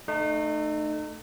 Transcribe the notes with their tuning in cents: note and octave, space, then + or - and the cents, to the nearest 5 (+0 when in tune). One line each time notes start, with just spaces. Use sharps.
A3 +0 D#4 -35